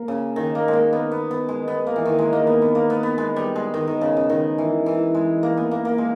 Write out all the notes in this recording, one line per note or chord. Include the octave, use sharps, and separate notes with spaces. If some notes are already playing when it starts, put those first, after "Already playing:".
Already playing: A#3
C#3
D#3
A#3
G#3
A#3
B3
B3
B3
G#3
B3
A#3
E3
D#3
G#3
A#3
B3
B3
A#3
B3
B3
G#3
G3
G#3
D#3
D#3
C#3
C#3
D#3
E3
E3
G#3
A#3
B3
A#3
A#3
G#3